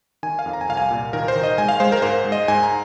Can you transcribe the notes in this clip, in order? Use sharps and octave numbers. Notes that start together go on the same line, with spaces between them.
D#3 G#5
F5
F2
A#5
G#5
C2 F5
G#5
A#2
D#3 A#4
C5
D#3
D#5
G#3 G#5
F5
G#3 C5
A#4
G#2 C5
G#3
D#5
G#2 G#5
A#5